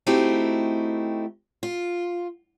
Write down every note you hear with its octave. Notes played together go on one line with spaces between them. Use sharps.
A3 C4 D#4 E4 F#4 G4
F4